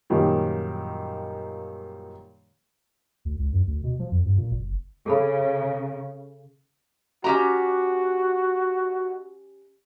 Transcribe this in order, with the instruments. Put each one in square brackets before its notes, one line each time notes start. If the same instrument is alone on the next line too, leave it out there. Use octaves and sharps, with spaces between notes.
[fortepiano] F#2 A#2 D#3 F3 G3
[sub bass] D2
C#2
F#2
D2
B2
F3
F2
G2
A#2
F#1
[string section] C#3 [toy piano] G#4 A4 B5
[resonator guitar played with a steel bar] C#4 G4 A#5 [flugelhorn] F#4